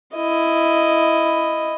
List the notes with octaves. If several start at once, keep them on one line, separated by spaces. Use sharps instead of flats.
E4 D#5